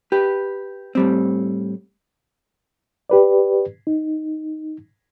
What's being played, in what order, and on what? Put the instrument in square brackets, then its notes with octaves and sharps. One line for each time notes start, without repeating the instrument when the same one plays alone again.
[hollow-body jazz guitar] G4 B4
A2 G3 C4
[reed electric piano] G4 B4 D5
D#4